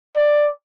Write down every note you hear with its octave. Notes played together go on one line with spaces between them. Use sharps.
D5